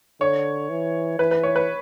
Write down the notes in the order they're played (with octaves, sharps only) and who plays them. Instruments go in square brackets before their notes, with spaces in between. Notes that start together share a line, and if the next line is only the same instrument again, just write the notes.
[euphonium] D3 [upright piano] C#5
[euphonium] E3
[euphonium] E3 [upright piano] B4
[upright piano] B4
C#5
B4